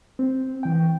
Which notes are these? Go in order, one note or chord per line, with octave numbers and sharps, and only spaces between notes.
C4
E3 G5